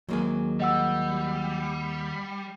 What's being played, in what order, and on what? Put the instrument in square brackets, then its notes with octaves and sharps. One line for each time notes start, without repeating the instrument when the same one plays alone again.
[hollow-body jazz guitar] D#2 A#3 G#4 [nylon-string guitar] F#3 G#3
[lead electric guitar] G3 [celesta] D#5 F#5 E6